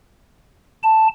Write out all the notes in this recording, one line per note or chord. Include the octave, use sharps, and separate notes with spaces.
A5